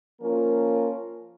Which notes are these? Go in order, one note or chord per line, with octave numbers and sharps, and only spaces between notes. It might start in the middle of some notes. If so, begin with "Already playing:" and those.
F3 A#3 C#4 F4 A#4